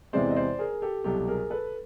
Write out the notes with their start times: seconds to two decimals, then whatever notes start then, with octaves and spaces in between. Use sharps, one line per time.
0.13 E2 C3 E3 G#3 C4 C5 D5
0.30 D#5
0.36 C5 D5
0.59 G#4 A#4
0.82 G4 A4
1.04 C2 B2 F#3 G4 A4
1.28 G#4 A#4
1.50 A4 B4